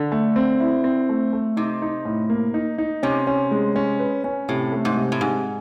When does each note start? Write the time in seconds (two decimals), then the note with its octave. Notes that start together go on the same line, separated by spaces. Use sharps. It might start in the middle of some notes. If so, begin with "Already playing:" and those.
Already playing: D3
0.12 A3
0.36 C4
0.60 E4
0.84 C4
1.09 A3
1.33 A3
1.57 C3 D#4
1.82 D#4
2.05 A2
2.30 A#3
2.54 D#4
2.78 D#4
3.03 C3 C#4
3.27 C#4
3.51 G#3
3.76 C#4
3.99 B4
4.24 C#4
4.49 A2 C3
4.72 A3
4.85 G#2
4.97 C3
5.12 A2
5.20 G#2 C3